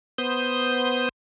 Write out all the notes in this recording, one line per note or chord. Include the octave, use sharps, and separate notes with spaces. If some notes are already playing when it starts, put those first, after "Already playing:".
B3 C5 D#6 G6